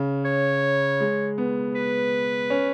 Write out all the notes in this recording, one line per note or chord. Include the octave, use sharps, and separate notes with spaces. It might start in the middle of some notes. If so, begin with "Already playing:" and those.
Already playing: C#3
C#5
G#3
B3
B4
C#4